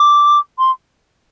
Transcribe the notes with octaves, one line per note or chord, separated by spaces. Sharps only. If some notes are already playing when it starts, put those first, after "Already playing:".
Already playing: D6
C6